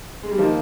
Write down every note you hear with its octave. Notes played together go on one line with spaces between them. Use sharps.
G#3
G3
D#3 F3 A#3 D#4